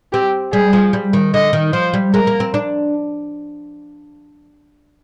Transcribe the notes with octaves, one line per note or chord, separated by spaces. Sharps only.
C4 G4
G3 G#4
F3
G3
D#3
D3 D#5
D#3
F3 C5
G3
G#3 A#4
A#3
C4
D4